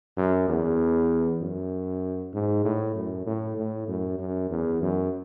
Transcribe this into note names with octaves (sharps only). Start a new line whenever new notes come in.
F#2
E2
F#2
G#2
A2
F#2
A2
A2
F#2
F#2
E2
F#2